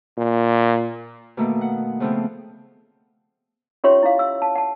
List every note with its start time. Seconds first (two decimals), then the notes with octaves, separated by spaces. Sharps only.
0.17 A#2
1.37 B2 D#3 A3 A#3
1.61 F#5
2.00 C#3 F3 A3 B3 C4
3.84 C#4 F4 G4 C#5 E5 C6
4.03 E4 F5
4.19 E6
4.42 A5
4.55 F#5 A5